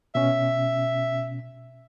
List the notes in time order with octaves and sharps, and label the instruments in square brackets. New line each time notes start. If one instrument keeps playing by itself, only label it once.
[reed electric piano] B2 C#4 [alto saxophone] E5